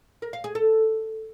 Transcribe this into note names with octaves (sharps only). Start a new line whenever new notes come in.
A#4
F5
G#4
A4